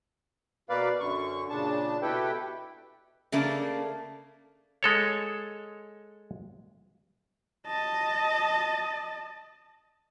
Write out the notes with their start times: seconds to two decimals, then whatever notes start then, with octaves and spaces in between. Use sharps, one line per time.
0.69 B2 A#3 B4 D5 F5
1.00 F#2 D3 C#6
1.50 A#2 C#3 D4 A5
2.02 B2 E4 G4 A4 B4 G5
3.32 C#3 A3 A#3 D4
4.83 G#3 A4 C#5
7.67 D#5 A5